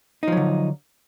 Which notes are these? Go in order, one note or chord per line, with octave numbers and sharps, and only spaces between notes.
D3 F3 F#3 D#4